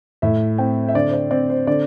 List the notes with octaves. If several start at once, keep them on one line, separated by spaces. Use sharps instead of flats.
A2 E5
C4 G5
E5
D3 D5
C5
D5
C4 D5
C5
D3 D5